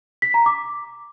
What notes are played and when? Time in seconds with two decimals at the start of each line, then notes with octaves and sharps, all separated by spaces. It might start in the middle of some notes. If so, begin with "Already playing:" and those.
0.22 B6
0.34 A#5
0.46 D6